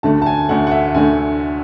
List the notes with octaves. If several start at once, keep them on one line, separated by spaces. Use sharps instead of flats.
D2 D3 A3 A5
A5
G#5
D2 D3 A3 F#5
F#5
E5
D2 D3 A3 G#5